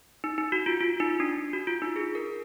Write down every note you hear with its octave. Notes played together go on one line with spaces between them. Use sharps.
D#4
D#4
F#4
F4
F4
D#4
D4
F#4
F4
D#4
G#4
A#4